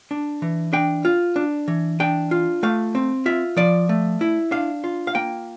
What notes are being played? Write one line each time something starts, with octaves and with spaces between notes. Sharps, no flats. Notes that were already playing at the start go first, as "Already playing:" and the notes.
D4
E3
D4 G5
F4
D4
E3
D4 G5
F4
A3 F5
C4
F4 E5
F3 D5
A3
E4
D4 F5
F4
F5
A#3 G5